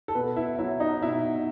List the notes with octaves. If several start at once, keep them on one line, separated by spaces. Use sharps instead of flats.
A4
B2 B4
E4
F#3 E4
D#4
B2 E4